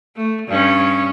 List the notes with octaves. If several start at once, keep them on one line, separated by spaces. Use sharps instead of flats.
A3
G2 C#4